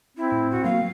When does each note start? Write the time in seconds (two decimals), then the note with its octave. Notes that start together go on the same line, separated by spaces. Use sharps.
0.17 C4 E4
0.32 A2
0.51 F#4
0.64 F#3 A#3 F5